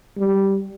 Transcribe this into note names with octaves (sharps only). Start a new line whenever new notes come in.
G3